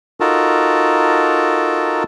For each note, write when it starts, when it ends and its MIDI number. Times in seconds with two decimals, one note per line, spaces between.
0.20 2.03 63
0.20 2.03 65
0.20 2.03 66
0.20 2.03 69
0.20 2.03 70
0.20 2.03 81